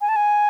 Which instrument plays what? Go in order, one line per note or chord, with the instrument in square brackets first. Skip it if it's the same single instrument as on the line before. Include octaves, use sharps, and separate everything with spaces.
[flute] G#5
A5
G#5